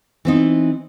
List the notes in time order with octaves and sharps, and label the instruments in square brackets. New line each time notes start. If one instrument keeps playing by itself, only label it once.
[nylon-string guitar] E3 C4 D#4